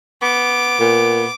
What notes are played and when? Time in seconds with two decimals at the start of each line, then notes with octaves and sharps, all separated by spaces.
0.22 B3 D6
0.80 A#2 B3